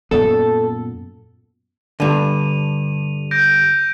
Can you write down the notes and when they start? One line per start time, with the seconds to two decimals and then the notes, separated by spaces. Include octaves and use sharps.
0.11 F#2 A#2 B3 A4
2.00 G2 D3 D#7 F7
3.31 G6 A#6 D7